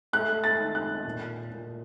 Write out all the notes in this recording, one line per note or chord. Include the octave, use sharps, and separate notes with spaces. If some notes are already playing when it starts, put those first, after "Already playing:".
A3 F#6
A6
D#3
F#6
A#2
A#2